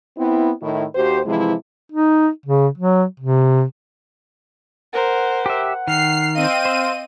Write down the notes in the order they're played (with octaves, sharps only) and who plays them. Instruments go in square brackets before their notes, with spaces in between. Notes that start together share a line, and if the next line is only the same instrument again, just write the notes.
[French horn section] B3 C4 E4
A2 D#3 E4
D#2 F#4 G4 C5
C3 E3 F3 G#3 E4
[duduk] D#4
C#3
F#3
C3
[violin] A#4 C5 [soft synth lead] F#5
[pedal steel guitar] G4 E5
[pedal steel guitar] D#3 [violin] F6 [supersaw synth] C7
[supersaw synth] C4 D#7 [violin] D#5 [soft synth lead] F5
[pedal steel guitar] C5